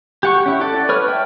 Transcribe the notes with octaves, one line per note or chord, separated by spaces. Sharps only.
G4 F#5 C#6
C#4 E4
A4 D5 F#5
B4 C#5 F6
E5 G5